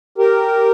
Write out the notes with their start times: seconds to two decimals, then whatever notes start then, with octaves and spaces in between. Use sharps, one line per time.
0.18 G4 A#4